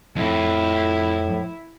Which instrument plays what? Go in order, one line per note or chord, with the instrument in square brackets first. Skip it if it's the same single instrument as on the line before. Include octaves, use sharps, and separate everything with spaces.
[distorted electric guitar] F2 [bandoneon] A2 [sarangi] E4